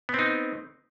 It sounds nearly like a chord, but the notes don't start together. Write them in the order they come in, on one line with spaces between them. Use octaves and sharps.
B3 C4 D#4